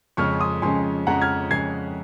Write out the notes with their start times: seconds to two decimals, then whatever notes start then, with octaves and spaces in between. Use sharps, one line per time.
0.17 F2 C#3 G#3 C#4 C#6 F6
0.39 C6 D#6
0.62 F2 C#3 G#3 C#4 G#5 C6
1.06 F2 C#3 G#3 C#4 F#5 A#5
1.21 F6 G#6
1.51 F2 C#3 G#3 C#4 G#6 C7